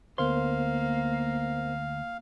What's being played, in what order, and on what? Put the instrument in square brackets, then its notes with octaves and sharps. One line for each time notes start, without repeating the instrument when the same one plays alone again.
[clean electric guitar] D2 C6 [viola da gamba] A#3 [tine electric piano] B3 A#4 C5 [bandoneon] F5